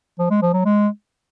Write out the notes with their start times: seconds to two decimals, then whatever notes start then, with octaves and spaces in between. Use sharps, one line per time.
0.19 F3
0.30 G#3
0.42 F3
0.53 F#3
0.65 G#3